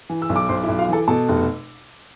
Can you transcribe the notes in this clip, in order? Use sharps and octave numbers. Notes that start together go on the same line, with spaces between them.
E3
E6
B1
D6
B1 C5 C6
E4 E5
B1
F4 F5
E3 A4 A5
B2 A4 A5
F1